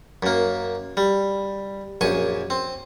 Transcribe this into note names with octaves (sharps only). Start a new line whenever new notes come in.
F#2 A#3
G3
A#1 F#2 G#5 C#6
C4